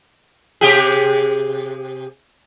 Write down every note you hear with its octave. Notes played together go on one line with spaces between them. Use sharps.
C3 G4 G#4